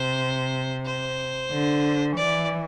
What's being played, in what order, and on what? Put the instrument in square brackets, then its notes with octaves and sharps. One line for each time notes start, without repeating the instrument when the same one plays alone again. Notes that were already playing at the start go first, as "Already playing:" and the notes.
Already playing: [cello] C3 [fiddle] C5
[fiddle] C5
[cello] D3
[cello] E3 [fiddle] D5